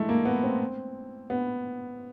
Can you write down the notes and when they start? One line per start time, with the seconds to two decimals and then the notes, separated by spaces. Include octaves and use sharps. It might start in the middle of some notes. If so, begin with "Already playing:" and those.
Already playing: E3 G#3 A3
0.09 A#3
0.25 B3
0.44 C4
1.30 B3